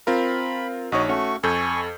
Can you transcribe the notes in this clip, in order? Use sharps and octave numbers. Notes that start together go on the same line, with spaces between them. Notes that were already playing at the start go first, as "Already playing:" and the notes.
C4 F4 A#4 B5
A#1 D#4 F#4 C#5 D#5
A3 C#4 F#4 C#6
F2 A4 G#5 C#6 G6